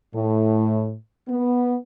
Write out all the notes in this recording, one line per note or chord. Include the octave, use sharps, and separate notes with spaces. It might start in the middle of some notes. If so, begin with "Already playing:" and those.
A2
B3